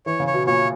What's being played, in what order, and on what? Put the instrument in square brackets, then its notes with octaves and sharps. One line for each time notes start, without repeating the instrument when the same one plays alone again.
[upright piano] E3 [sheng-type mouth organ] C#5
[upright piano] C#3
[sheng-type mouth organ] C#5
[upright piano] B2
[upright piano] A#2 [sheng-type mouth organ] C#5